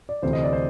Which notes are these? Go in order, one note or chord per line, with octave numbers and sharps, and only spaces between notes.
D5
D2 C3 E3 C5
D#5
D5
C5